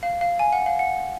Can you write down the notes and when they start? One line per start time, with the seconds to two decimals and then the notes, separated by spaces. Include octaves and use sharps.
0.03 F5
0.21 F5
0.39 G#5
0.53 F#5
0.66 F5
0.79 F#5